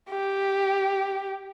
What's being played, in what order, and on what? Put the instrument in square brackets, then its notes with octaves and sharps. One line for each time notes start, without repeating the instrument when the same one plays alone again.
[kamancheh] G4